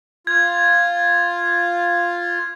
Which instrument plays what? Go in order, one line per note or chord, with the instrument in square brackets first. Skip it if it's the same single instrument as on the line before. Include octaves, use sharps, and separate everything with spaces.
[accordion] F4 [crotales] G#6